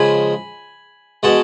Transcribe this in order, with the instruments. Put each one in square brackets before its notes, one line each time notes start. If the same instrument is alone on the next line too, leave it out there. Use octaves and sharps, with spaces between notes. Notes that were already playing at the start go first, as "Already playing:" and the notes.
Already playing: [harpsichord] C#3 F3 G#3 G#5 B5
B2 G#3 F#5 A5